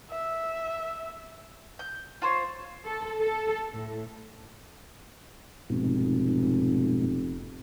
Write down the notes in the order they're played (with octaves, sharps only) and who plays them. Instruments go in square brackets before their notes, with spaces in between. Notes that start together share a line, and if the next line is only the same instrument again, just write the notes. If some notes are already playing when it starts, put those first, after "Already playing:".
[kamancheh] E5
[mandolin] G6
F4 C5 C#5
[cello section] A4
A4
A2
[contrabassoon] F1 [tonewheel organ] G#2 B2